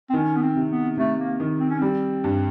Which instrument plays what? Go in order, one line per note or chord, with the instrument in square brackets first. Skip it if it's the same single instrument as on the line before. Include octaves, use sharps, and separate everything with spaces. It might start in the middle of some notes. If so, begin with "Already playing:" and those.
[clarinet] C4
[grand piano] D#3 [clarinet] C#4
[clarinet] B3
C4
[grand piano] C3
[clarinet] B3
[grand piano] C3 [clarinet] A3
[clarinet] A#3
[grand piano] D#3
[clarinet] C4
C#4
[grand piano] G3 [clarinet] C4
[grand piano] G2